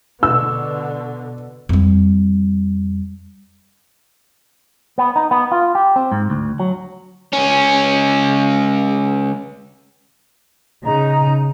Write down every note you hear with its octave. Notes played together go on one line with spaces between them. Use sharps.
B2 D3 E6
F2 G3
B3
D#4
B3
F4
G4
C4
G#2
D2
F#3
C#2 C#4
C#3 D#4 A#5